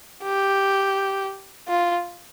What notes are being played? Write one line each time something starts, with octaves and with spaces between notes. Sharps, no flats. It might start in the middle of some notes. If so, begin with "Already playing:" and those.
G4
F4